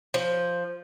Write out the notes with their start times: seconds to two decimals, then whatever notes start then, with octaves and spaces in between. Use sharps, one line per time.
0.14 F3